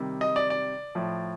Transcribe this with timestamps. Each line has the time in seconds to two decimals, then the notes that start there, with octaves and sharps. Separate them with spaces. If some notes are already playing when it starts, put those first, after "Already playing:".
Already playing: C3 D#3 G3
0.21 D#5
0.36 D5
0.50 D5
0.95 A2 F3